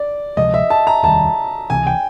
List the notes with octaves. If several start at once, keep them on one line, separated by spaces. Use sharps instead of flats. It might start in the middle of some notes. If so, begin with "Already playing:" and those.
Already playing: D5
D2 C3 F3 G#3 D#5
E5
A5
A#5
F1 D#2 D#3 G3 A5
C#2 C3 E3 G#5
G5